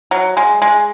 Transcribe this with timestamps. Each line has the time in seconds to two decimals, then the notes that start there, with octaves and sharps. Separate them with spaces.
0.11 F#3
0.37 G#3
0.62 G#3